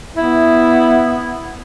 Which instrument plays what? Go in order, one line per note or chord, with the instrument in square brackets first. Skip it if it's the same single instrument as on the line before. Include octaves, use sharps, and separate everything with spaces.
[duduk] B3 [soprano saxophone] E4